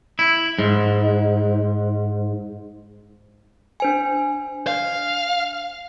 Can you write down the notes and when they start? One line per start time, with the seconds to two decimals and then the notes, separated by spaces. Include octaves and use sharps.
0.19 E4
0.59 G#2
3.80 D4 C5 G#5
4.67 F5